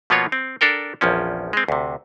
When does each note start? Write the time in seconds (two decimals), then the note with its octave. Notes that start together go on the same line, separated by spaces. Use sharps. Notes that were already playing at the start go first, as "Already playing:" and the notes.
0.10 B2 F3 A#3 B3 F4 C#5
0.32 C4
0.61 D4 A4 A#4 G5
1.01 A#1 E2 F3 C#4
1.53 G#3 C4
1.68 D2 C3